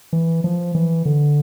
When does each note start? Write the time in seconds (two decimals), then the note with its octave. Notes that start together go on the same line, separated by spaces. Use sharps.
0.13 E3
0.44 F3
0.75 E3
1.05 D3